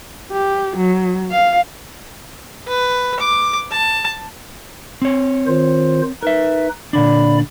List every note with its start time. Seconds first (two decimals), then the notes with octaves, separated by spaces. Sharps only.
0.33 G4
0.77 F#3
1.32 F5
2.68 B4
3.20 D6
3.71 A5
5.02 C4 C#5
5.47 D#3 F4 C5
6.23 D#4 A#4 B4 E5
6.93 A#2 D3 D4 D5 B5